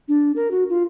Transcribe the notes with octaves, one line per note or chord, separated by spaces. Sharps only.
D4
A#4
F#4
F4